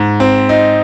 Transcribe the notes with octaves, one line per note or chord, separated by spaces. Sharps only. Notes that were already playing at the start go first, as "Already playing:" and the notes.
Already playing: G#2
C4
D#4